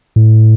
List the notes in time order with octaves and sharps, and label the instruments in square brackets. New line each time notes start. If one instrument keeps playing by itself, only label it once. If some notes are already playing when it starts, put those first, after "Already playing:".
[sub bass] A2